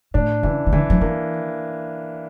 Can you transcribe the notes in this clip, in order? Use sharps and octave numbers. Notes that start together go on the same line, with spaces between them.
A2 D4
C#3 E3
C#3
D3 E3
F3
E3 A#3